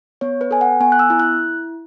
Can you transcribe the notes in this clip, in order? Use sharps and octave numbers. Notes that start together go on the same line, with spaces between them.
B3 C#5
B4
A4 G#5
F#5
B3 G#5
F#6
E6
E4
F#6